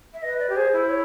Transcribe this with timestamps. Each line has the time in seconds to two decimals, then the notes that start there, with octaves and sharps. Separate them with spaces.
0.13 E5
0.22 B4 D#5
0.39 D5
0.49 G4
0.56 G#4 C5
0.73 E4
0.90 C#5